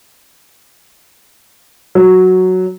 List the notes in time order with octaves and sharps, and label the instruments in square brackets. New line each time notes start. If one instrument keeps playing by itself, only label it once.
[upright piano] F#3